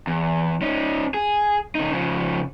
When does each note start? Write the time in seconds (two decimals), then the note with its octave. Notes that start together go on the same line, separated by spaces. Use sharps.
0.07 E2
0.62 C#4 D#4
1.14 G#4
1.75 C#3 D#4
1.91 C#3 F3